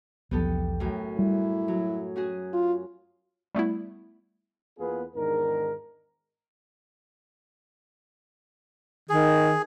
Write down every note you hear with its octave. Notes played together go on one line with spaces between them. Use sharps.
B1 E2 F3 B3 G4 A4
F#2 A2
G3 E4
F#3
C#4 F#4 G#4
F4
G3 A3 B3 E4
E2 A#3 B3 F4 G#4 B4
E2 G#2 D#3 D4 A#4
D#3 G#4